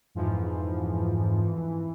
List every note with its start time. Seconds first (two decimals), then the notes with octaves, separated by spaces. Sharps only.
0.15 F2 G#2 E3 F3
1.40 E3